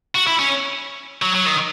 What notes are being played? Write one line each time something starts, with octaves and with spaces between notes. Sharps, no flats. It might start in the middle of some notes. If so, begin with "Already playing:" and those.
F#4
E4
C#4
F#3
F#3
D#3